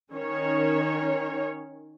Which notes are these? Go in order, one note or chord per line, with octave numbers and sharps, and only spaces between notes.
D#3 C#4 C#5